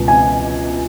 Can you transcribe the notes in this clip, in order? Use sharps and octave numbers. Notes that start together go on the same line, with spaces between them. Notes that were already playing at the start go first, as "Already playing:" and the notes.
Already playing: C#2 B2 B3
G#5